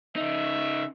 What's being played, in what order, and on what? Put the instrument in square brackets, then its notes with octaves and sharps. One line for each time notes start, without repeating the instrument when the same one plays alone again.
[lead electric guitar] C#3 D#4 [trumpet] E5